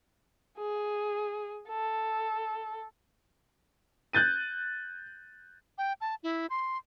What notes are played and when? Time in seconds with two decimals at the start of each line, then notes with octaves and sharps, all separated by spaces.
0.58 G#4
1.69 A4
4.13 F#6 G6 A6 D#7
5.78 G5
6.01 A5
6.23 E4
6.50 C6